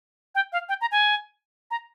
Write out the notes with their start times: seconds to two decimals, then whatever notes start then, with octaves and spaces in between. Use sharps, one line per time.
0.35 G5
0.53 F5
0.69 G5
0.81 A#5
0.92 G#5
1.71 A#5